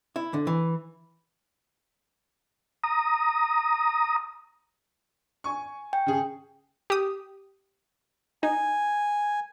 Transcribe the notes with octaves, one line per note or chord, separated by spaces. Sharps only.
E4
D3
E3
A#5 D#6
G#5 C#6
G5
C#3 G#4
G4 D#6
D#4 G#5